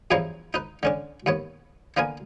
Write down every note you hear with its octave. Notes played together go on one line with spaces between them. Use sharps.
E2 G2 F3 E4 C#5 A#5
D#4 B4
D3 C#4 D4
D#2 B3 C#5
D3 A#3 B3 A#4 G#5